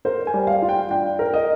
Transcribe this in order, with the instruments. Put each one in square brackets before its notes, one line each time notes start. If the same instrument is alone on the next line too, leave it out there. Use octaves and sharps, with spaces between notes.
[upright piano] A#4 [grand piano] C5
[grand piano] G#5
[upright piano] G3
[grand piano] F5
[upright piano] F4
[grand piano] G5
[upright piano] D4 [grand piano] G5
[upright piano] A#4
[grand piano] D#5